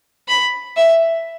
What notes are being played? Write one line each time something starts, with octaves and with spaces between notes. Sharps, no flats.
B5
E5